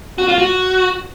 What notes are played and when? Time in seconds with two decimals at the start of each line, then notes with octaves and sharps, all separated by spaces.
0.18 F#4
0.28 F4
0.38 F#4